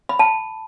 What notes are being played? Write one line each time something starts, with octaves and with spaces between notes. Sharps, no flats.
B5
A5